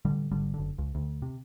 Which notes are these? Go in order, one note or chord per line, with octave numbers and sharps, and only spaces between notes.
A1 D3 G3
G#1 D3 G3
F#1 D3
C#2
D2
C3